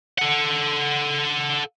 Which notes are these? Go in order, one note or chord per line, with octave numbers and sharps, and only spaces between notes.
A4 F#5